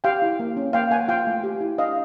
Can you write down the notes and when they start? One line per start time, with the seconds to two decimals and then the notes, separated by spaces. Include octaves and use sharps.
0.04 G4 F5 G5
0.22 E4
0.39 A#3
0.57 C#4
0.73 A#3 F5 G5
0.91 A#3 F#5 G#5
1.08 F4 F5 G5
1.27 A3
1.44 G4
1.61 E4
1.78 D4 D#5 F5